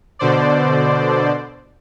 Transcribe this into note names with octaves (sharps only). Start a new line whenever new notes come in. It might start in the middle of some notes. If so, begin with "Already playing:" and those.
B2 D3 C5 D5